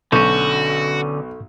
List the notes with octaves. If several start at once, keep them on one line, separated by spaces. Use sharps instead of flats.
B1 D3 C#4 F#4 A4 C#6 G6